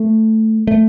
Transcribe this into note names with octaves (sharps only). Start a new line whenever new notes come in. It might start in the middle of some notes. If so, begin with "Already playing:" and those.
Already playing: A3
A3